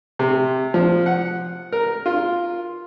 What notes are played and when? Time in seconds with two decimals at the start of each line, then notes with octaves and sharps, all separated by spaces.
0.19 C3
0.74 F3
1.06 F#5
1.72 A#4
2.06 F4